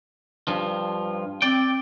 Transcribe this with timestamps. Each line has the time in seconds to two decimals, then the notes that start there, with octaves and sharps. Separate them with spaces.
0.48 G2 F3
1.42 C4 D5 G5